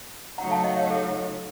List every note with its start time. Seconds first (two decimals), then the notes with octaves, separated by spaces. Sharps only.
0.38 C#3 F#3 A3 D#4 F#4 F#5 A#5
0.51 F5 A5
0.64 D#5 F#5
0.77 C#5 F5
0.90 A4